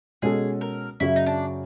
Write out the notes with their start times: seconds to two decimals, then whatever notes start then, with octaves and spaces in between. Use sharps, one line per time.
0.22 B2 G#3 C#4 F#4 G#4 A4
0.61 A#4
1.00 F#2 C#3 F#3 E4
1.16 D#4
1.26 D4